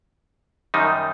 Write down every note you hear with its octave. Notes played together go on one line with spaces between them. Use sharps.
F#2 D#3 G3 D#4